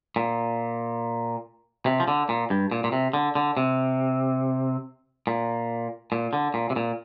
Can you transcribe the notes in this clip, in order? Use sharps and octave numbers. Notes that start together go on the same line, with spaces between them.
A#2
C3
F3
D3
A#2
G2
A#2
A#2
C3
D3
D3
C3
A#2
A#2
D3
A#2
C3
A#2